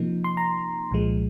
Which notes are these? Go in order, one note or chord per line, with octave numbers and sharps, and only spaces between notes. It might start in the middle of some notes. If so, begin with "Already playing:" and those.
Already playing: C3 F3 A#3 D#4
C6
A#5
C2 A#2 F3 G#3